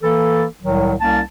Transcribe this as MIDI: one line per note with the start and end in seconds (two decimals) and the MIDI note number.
0.03 0.44 52
0.03 0.44 58
0.03 0.44 69
0.62 0.94 36
0.62 0.94 45
0.62 0.94 51
0.62 0.94 54
1.01 1.20 36
1.01 1.20 58
1.01 1.20 61
1.01 1.20 81